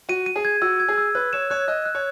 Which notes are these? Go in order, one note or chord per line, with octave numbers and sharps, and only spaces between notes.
F#4 D#7
D#7
G#4
G#6
F#4 E6
G#6
G#4
E6
B4 F#6
C#5 E7
C#5 F#6
D#5 F#6
F#6
C#5